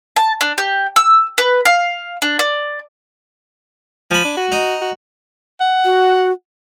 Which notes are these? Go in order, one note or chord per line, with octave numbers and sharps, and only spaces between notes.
A5
D4
G4
E6
B4
F5
D4
D5
F3 G#5 B5
D4
F#4
D#4
F#4
F#5
F#4